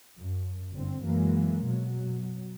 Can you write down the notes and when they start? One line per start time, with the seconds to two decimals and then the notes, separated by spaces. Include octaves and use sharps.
0.16 F#2
0.73 G1 D3 C4
1.04 F#2 E3 F#3 G#3 A#3
1.65 B2 F#3